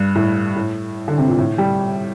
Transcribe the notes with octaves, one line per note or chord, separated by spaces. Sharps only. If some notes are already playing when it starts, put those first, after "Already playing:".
Already playing: G2
A2
A2
D3
C3
A#2
A2
G3